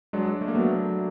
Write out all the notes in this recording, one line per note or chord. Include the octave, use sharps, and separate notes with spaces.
F#3 G#3 D4
A3
A#3
F#3 A3 B3